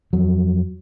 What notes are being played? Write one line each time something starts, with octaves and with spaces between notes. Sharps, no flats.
F2 F#3